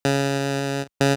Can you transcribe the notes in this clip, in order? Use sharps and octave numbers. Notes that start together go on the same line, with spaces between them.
C#3
C#3